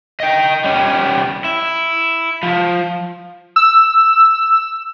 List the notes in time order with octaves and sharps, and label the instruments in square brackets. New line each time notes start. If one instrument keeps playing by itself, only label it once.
[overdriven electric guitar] D#5 G5
G3 C#4
E4
F3
[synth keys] E6